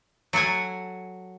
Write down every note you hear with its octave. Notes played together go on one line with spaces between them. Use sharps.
F#3 A4 F#5 G#5